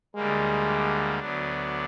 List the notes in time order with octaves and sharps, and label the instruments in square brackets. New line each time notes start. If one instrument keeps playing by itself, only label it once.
[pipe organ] D2 D3 G3 A#3 [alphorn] G#3
[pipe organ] D2 D3 F#3 B3 D4